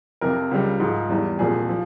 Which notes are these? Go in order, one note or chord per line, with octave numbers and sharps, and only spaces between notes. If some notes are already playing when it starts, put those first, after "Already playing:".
F2 C3 F3 A#4
C#2 C#3 G3
G#2 F3
E2 E3 G3
C2 A#2 F3 G#4
F3